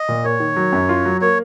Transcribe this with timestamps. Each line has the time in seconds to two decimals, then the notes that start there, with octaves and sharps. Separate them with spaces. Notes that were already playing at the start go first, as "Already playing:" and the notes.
Already playing: D#5
0.09 A#2
0.24 A#3 C#5
0.40 D#3
0.56 F#3
0.73 F#2
0.89 F4
1.05 F#3
1.21 A#3 C#5